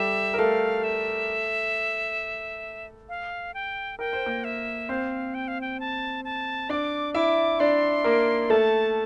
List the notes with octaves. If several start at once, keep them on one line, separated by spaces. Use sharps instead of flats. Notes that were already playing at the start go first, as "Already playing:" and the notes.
Already playing: G3 G4 A4 E5
A#4
A3 A4 F5
E5
F5
G5
A#4 G5
C5
A#3 A#4
E5
C4 C5 F5
G5
F5
G5
A5
A5
D4 D5 D6
E4 E5 D6
D4 D5 C6
A#3 A#4
A3 A4 A5